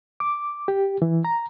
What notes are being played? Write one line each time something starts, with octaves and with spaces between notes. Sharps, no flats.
D6
G4
E3
A#5